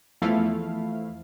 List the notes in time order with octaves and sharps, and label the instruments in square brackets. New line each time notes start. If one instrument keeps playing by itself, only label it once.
[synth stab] E2 F3 A3 E4 F5